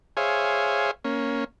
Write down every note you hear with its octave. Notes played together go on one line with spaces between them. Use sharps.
G#4 C5 C#5 E5 F5 G#5
A#3 C#4